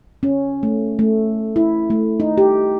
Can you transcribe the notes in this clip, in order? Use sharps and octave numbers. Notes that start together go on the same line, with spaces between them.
C#4
A3
A3
E4
A3
D#4
G4